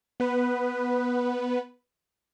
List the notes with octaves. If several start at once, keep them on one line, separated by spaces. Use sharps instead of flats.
B3 B4